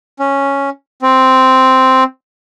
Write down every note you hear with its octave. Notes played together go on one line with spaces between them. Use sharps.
C#4
C4